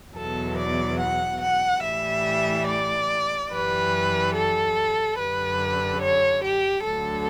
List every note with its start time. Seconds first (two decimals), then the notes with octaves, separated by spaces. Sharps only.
0.15 E2 B2 F#3 A4
0.58 D5
0.99 F#5
1.41 F#5
1.82 A2 E3 G3 E5
2.67 D5
3.50 F#2 E3 G3 B4
4.35 A4
5.18 F#2 D3 G3 B4
6.02 C#5
6.44 G4
6.85 D2 D3 F#3 A4